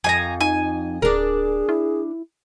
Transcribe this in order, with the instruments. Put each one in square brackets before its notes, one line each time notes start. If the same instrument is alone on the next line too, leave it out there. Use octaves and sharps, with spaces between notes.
[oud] F2 D#5 [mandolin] G#5 A#5
[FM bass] D#4 [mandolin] G#5
[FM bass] D1 [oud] D4 A#4 [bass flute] G#4
[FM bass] E4